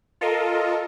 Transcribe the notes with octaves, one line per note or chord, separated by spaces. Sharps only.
F4 A4 A#4 D#5